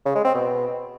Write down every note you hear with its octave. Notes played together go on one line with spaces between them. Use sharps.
C#3
G#3
C4
B2